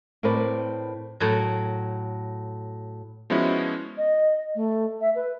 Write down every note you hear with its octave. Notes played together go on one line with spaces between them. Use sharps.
A2 C4 A#4 B4 D5
A2 F#3
F3 G#3 B3 C#4 E4 F#4
D#5
A3
E5
B4